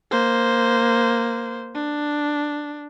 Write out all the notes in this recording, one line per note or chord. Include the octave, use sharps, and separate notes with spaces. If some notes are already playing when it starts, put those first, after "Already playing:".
A#3 C5
D4